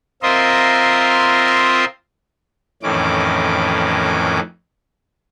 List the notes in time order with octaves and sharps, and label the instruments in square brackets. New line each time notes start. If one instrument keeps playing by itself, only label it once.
[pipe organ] C4 F4 A#4 D#5 E5 C6
F2 A2 D#3 E3 C#4 D6